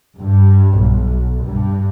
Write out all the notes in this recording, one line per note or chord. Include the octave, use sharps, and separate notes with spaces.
G2
B1
G2